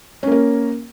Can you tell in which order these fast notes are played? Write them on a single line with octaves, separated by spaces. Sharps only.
C#4 A#3 A#4